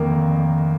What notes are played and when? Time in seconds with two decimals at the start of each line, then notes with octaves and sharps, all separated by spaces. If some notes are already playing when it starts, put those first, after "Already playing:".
Already playing: F1 F2 D3 D#3 A#3